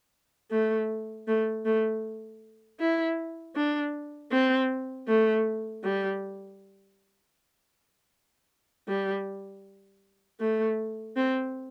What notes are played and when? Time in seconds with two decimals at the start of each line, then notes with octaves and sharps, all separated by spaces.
0.51 A3
1.27 A3
1.65 A3
2.79 E4
3.55 D4
4.31 C4
5.08 A3
5.83 G3
8.88 G3
10.40 A3
11.16 C4